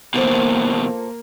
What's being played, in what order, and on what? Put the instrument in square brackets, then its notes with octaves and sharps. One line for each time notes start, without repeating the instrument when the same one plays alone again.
[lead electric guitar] D#2 B2 [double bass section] A#3 [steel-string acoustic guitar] F4 A4 C5